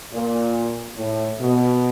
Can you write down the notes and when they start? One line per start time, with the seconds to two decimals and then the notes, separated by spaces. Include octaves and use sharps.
0.12 A#2
0.96 A2
1.39 B2